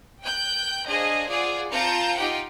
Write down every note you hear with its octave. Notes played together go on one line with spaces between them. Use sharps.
G5 F#6 G6
D4 G#4 C5 D#5 F5
F4 G#4 D5 F#5
C4 F4 A5 A#5 G6 C#7
D#4 F4 G4 F#5 G5